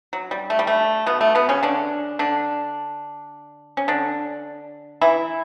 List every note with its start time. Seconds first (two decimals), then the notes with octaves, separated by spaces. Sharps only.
0.13 F#3
0.31 G3
0.50 A3
0.59 G3
0.67 A3
1.06 B2 B3
1.21 A3
1.35 B2 B3
1.49 C#3 C#4
1.63 D3 D4
2.19 D3 D4
3.77 C#4
3.88 D3 D4
5.01 E3 E4